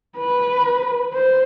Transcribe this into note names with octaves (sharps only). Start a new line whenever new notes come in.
B4
C5